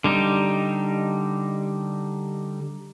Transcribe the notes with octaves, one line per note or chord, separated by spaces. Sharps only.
D3 G3 D#4